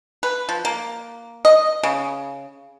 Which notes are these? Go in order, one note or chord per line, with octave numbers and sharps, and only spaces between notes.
B4
F3
A#3
D#5
C#3